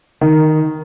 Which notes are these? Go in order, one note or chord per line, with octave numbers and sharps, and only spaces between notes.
D#3